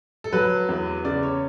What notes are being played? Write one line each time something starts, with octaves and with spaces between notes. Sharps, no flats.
A4
F#3 B4
E2
C#3 D5
C#5